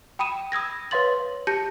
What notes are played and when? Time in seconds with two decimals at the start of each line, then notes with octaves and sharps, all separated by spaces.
0.19 G5 B5 D#6 D#7 E7
0.52 D#6 E6 G#6 A#6
0.91 B4 C#5 F5 C6 A6 F#7
1.47 G4 A5 G6 A#6 C#7